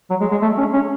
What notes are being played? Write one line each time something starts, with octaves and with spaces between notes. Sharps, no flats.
F#3
G#3
G#3
A3
C#4
C#4